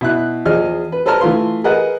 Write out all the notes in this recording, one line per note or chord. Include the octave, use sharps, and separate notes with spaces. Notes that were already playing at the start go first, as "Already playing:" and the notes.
B2 E4 F#6
E2 F3 G#4 D#5 F6
B4
A4 B4 C5 A5 A#5 F6
E3 A3 F4 C6
G#4 A#4 B4 D#5 F#5